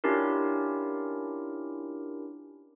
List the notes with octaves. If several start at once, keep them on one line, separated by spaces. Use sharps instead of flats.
C#4 D4 E4 F4 G4 A#4